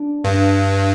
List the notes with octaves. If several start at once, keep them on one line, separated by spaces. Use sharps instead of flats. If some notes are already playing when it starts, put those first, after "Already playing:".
Already playing: D4
G2